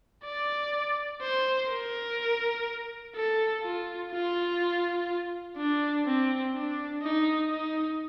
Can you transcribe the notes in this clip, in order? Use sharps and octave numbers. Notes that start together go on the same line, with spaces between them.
D5
C5
A#4
A4
F4
F4
D4
C4
D4
D#4
D#4